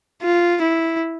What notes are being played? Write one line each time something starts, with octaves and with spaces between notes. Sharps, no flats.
F4
E4